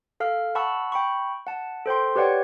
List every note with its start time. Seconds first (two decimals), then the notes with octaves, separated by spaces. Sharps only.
0.20 A4 F5 F6
0.55 F#5 A5 B5 C#6 E6
0.92 G5 B5 C#6
1.47 F#5 A5
1.86 A4 C5 G5 C6
2.16 G4 B4 C#5 D5 F#5 G5